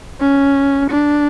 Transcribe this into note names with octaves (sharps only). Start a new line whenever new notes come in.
C#4
D4